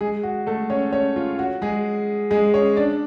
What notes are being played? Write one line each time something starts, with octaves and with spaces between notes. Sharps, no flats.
G#3 G#4
F#4
A3 A4
C#4 C#5
C#4 C#5
F4
F#4
G#3 G#4
G#3 G#4
C#4 C#5
D4 D5